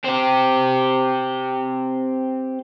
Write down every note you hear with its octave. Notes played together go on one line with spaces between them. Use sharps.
C4 G4